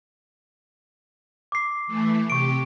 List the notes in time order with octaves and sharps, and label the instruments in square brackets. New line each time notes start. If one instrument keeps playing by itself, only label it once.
[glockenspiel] D6 C7
[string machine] E3 A3
[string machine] C3 G4 [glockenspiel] C#6 D7